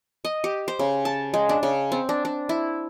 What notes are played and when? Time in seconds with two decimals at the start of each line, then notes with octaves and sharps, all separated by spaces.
0.25 D#5
0.44 G4
0.68 C5
0.79 C#3
1.05 A5
1.34 G#3
1.49 D4
1.63 C#3
1.92 C4
2.09 D4
2.25 D4
2.49 E4